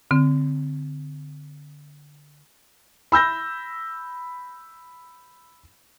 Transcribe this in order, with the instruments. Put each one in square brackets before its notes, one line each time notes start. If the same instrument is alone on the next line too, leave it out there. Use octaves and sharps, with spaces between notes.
[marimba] D3 C4
[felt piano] B5 E6 G6 A#6